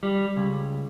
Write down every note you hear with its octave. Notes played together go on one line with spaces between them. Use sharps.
G3
C#2